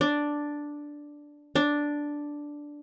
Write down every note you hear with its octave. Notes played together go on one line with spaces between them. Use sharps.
D4
D4